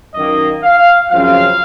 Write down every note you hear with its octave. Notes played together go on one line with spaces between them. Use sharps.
F#2 D#3 A#3 D#5
F5
F#2 C#3 F3 C4 F5